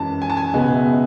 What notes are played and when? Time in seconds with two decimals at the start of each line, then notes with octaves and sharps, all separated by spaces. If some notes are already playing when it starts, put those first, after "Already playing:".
Already playing: F#2 E3 G#3 A5
0.22 G#5
0.30 A5
0.37 G#5
0.53 C#2 B2 G#3 B3 G#5
0.75 E5